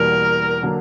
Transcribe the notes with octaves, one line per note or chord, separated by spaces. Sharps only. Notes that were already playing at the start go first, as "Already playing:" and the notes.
Already playing: E2 B2 G3 A#3 A#4
D3 F#3 A#3 D4